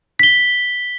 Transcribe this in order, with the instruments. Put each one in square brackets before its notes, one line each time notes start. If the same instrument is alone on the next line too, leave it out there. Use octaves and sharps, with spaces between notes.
[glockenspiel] B6 G7